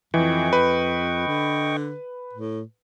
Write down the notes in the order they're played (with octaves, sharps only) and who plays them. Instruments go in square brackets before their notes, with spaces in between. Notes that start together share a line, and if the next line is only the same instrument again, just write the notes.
[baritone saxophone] F2 [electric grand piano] E3 [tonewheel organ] D#5 G5 C#6
[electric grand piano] B4
[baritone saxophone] D3
A2